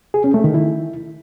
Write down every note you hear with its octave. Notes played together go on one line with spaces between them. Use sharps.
G#4
C#4
A3
D#3
E4